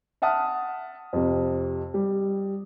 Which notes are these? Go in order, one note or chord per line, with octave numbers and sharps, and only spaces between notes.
E5 F#5 A5 D#6 F6
F2 C3
G3